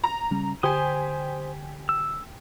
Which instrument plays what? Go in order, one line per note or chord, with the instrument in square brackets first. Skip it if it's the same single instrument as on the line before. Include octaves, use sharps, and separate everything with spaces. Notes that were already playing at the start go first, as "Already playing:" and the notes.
[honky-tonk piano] A#5
[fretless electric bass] C#3 G3 C#4
[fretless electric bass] D3 [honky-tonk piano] G4 G#5 [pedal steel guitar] C5 D#6
[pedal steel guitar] E6